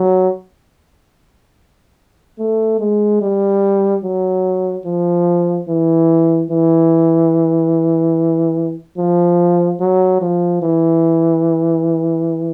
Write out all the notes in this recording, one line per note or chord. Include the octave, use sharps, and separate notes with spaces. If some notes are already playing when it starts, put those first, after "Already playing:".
Already playing: F#3
A3
G#3
G3
F#3
F3
E3
E3
F3
F#3
F3
E3